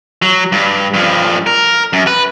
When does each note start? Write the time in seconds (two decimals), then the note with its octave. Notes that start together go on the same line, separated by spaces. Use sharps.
0.22 F#3
0.52 G2
0.94 G2 F3
1.46 A#4
1.93 F#2
2.07 B4